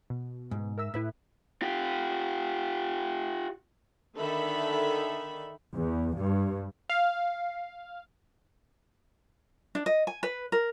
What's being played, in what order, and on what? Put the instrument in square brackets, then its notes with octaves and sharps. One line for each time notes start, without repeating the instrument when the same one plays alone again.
[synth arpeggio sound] B2
[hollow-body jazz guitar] G#2
[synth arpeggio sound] A#4 E5 E6
[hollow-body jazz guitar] A2 [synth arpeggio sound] E4 B4 E5
[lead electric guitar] F4 G4
[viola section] D3 D#3 A4 E5 B5
[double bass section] E2
G2
[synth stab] F5
[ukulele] D4
D#5
G#5
B4
A#4